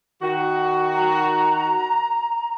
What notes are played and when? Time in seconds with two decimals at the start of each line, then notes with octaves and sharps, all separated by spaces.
0.22 D#3 F#4
0.95 A#5